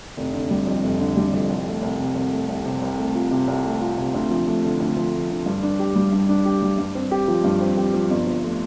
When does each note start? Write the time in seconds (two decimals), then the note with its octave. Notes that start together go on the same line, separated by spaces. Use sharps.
0.17 F1
0.34 D3
0.51 G3
0.67 F2
0.84 F1
1.00 D3
1.17 G3
1.33 F2
1.49 C2
1.66 A3
1.83 C2
1.99 C3
2.16 C2
2.32 A3
2.49 C2
2.65 C3
2.82 C2
2.98 A3
3.15 F4
3.31 C3
3.48 C2
3.65 A3
3.81 F4
3.97 C3
4.14 D2
4.30 F3
4.47 A3
4.64 D3
4.80 D2
4.96 F3
5.13 A3
5.30 D3
5.46 G2
5.63 D4
5.79 G4
5.95 G3
6.12 G2
6.29 D4
6.45 G4
6.62 G3
6.78 G2
6.95 C4
7.11 G4
7.28 F3
7.44 G2
7.61 C4
7.77 G4
7.94 F3
8.10 G1
8.27 F3
8.44 A3